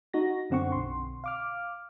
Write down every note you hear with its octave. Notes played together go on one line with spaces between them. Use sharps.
D#4 F#4 A#6
F#2 D3 C4 F#5 C#6
B1 C6
F5 D6 F6